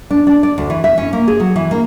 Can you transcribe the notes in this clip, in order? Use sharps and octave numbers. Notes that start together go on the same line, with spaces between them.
D4
D4
D5
D2
E3
E5
C#4
A#3
G#4
F#3
E3
A#3